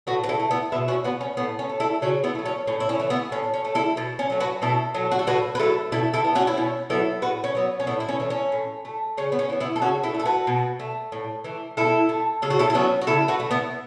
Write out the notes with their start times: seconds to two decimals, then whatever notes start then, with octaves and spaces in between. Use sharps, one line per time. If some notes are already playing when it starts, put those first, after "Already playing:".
0.07 A2 F#4 B4
0.24 B4
0.29 E4 A4
0.40 A3
0.51 B3 E4
0.72 B2 B3 E4
0.88 C#4 F#4
1.04 B3 F#4 B4
1.21 C#4
1.37 A2 B3
1.59 C#4
1.69 A3
1.80 E4 A4
2.02 C#3 C#4 F#4
2.24 B3 E4
2.35 F#3 A3
2.46 C#4
2.67 A2 C#4
2.80 E4
2.89 C#4
2.99 E3 A3
3.10 B3 E4
3.32 A2 C#4
3.54 C#4
3.65 A3
3.75 E4 A4
3.97 B2
4.19 C#4
4.30 F#3 A3
4.40 F#4 B4
4.62 B2 E4 A4
4.95 F#3 A3
5.12 F#4
5.19 A4
5.27 A2 F#4 B4
5.55 B4
5.59 F#3 A3 E4 A4
5.92 B2 E4 A4
6.14 E4 A4
6.25 B3
6.35 C#4 F#4
6.47 E4
6.57 B2 C#4
6.90 F#3 B3 E4 A4
7.22 A2 F#4 B4
7.44 C#4
7.55 F#3 B3
7.80 C#4
7.87 A2 B3 E4
8.00 E4
8.09 C#4
8.20 E3 A3
8.30 C#4
8.52 A2
8.85 A3
9.17 C#3 C#4
9.32 B3
9.39 C#4
9.50 E3 B3
9.60 B3 E4
9.76 A4
9.82 C#3 C#4 F#4
10.04 E4 A4
10.14 A3
10.20 A4
10.25 F#4 B4
10.47 B2
10.80 A3
11.12 A2
11.44 E3 A3
11.77 B2 E4 A4
12.09 A3
12.42 C#3 A4
12.50 F#4
12.59 E4 A4
12.70 A4
12.74 F#3 B3 C#4 F#4
13.01 F#4
13.07 C#3 E4 A4
13.28 F#4 B4
13.40 A3
13.51 B3 E4